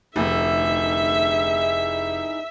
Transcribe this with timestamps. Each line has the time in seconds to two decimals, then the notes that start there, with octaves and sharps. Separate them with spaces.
0.16 F1 D2 D#4 E4 G#4 E5